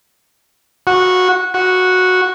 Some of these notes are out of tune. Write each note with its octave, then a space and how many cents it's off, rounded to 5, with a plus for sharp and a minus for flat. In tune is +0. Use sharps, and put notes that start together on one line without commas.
F#4 -15
F#4 -10